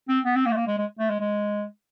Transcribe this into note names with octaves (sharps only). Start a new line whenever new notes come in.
C4
B3
C4
A#3
A3
A#3
G#3
G#3
A3
G#3
G#3